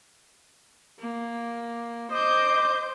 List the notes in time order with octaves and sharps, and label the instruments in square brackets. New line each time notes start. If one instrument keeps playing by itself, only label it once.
[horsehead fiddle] A#3
[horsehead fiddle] C5 [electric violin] D#5 G6 [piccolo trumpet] D6